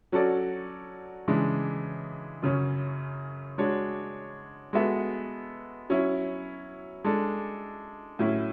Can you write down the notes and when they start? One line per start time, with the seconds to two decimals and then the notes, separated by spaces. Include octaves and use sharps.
0.12 F#3 C#4 F#4 A4 D5
1.28 C#3 E3 G#3 D4
2.42 F#2 C#3 F#3 C#4
3.58 G#3 D4 F#4 C#5
4.73 G#3 B3 F#4 A4 E5
5.89 F#3 C#4 E4
7.04 G#3 D4 A4
8.19 A2 F#3 C#4 E4